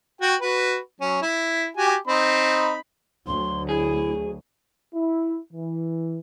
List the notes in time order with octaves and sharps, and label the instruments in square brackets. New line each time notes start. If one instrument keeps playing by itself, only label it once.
[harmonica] F#4 G5
F#4 B4
F#3 C#4
E4
F#4 G4 G#5
C4 D#4 B5
[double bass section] D2 F#3 [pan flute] C6
[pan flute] E4 [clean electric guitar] G#4
[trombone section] E4
E3